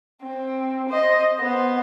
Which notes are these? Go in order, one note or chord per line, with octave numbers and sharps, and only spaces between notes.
C4
C5 D#5
B3 C5